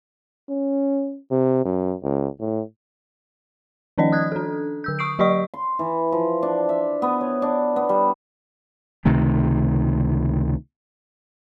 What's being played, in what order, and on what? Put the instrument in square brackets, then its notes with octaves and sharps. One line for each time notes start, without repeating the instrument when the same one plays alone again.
[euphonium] C#4
C3
F#2
C#2
A2
[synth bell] D#3 F3 C#4 D#4 D5 D#5
D#6 F#6 G#6
D4 A4
D3 E6 G6
C#6 D#6 C7 D7
F#3 G4 D5 D#5 C#6
[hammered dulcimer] C6
E3
F3
D4
E5
B3
C#5
D4
B3
G3
[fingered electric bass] C#2 C3 D#3 A3